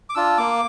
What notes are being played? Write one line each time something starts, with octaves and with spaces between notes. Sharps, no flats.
D6
D4 F4 E6
A#3 D6